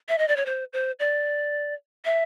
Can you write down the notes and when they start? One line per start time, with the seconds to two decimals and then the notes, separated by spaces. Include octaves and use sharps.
0.09 E5
0.18 D#5
0.28 D5
0.36 C#5
0.46 C5
0.73 C5
0.99 D5
2.05 E5